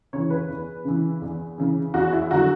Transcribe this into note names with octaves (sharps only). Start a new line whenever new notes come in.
C#3 E3 C#5
B4
E2
C#3 E3
E2
C#3 E3
E2 F#4
E4
D3 F#3 F#4